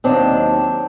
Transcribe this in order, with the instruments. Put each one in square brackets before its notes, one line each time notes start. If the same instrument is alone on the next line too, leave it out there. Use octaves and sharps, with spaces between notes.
[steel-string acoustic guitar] D#2 D#3 F#3 C4 D4